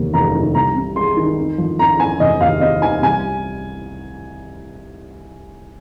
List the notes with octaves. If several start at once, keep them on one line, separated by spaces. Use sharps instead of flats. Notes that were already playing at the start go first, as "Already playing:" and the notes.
Already playing: F1 D#2 A#3
F1 A#5
D#3
C2 A#5
C3
G#3 C6
D#3
F2
F3
F2 A#5
C4 G#5
F1 D#5
D#2 F5
C4 D#5
D#3 G#5
C2 G#5